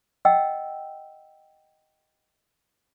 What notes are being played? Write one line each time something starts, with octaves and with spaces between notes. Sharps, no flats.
D#5 F#5 G5 E6